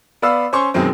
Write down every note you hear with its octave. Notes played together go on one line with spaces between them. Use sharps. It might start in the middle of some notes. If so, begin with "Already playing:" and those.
B3 D5 F5 B5 E6
C#4 C5 C6 C#6
F#2 B2 D#3 F#3 G#3 C4